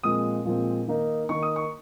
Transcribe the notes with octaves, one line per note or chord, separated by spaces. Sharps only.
A#2 F3 G#3 C4 D#6
A#2 F3 G#3 C4
D#3 A#3 D#4
D#3 A#3 D#4 C#6
D#6
C#6